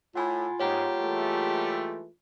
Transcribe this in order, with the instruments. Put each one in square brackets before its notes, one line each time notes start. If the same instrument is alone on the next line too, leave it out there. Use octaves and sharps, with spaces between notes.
[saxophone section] A2 [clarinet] F4 [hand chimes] F#5 G#5 B5
[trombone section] G#2 [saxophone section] G3 A#3 G4 [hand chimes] C#5 F#5 A#5
[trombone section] E3 G#3 A3